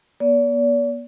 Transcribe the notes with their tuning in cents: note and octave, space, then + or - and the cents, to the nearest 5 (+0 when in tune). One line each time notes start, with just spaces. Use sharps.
B3 -40 D5 -40